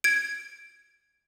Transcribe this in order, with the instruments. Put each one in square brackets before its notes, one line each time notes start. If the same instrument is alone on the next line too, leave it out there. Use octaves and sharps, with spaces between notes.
[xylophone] G#6 D7